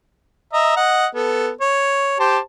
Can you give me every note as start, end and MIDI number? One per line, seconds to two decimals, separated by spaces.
0.53 0.76 75
0.53 0.76 76
0.53 0.76 82
0.77 1.06 75
0.77 1.06 78
1.15 1.49 59
1.15 1.49 69
1.61 2.16 73
2.19 2.38 67
2.19 2.38 72
2.19 2.38 81